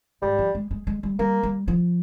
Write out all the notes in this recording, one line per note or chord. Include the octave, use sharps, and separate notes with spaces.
G#2 G3
F3
G#3
G#3
G#3
G3
G3 A#3
G3
F3